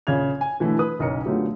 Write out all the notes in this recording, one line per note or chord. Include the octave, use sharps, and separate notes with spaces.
A#1 C#3 C#4 G#4 G#6 F7
G#5
B2 D3 E3 F#3 A3 E4
B4 D#6
F#1 B1 C#4 A#4 D#5 C#7
A#2 D3 F#3 A3 B3 G4